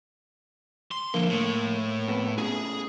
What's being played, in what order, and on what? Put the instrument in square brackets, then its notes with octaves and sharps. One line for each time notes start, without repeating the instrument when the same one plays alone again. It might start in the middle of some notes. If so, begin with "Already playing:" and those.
[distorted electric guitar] C6
[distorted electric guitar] D3 F3 [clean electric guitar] A#3
[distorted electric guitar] A2
[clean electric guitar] F2 B3
[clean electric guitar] A2 C#3 [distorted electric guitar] G#4